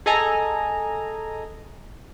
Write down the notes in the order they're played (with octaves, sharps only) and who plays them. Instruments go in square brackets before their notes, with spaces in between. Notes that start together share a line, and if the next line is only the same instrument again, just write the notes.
[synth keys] G#4 A4 D#5 G#5 A#5